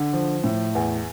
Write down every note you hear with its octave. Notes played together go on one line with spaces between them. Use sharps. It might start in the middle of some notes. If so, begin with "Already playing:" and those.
Already playing: D3
F3
A2
E2